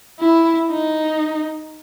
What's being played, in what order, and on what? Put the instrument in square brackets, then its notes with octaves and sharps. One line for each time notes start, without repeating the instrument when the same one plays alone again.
[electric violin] E4
D#4